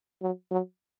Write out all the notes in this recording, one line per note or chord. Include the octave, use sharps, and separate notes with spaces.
F#3
F#3